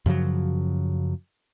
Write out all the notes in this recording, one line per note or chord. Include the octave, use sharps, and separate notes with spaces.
F#2 C#3 F3 F#3